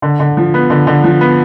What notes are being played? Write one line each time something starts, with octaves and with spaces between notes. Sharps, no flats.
D3
D3
F3
B3
D3
D3
F3
B3